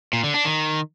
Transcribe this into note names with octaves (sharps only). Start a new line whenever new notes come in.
A#2
D3
D4
D#3